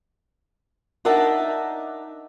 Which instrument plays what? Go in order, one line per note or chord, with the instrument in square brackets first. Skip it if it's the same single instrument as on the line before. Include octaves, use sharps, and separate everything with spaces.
[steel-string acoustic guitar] D4 D#4 A#4 E5 F#5 A5